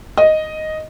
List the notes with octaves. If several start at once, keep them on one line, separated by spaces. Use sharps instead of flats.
D#5